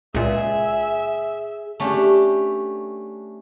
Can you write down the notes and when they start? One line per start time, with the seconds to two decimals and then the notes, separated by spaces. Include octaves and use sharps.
0.15 C#2 A#2 G#4 E5
1.80 A3 C#4 D4 G4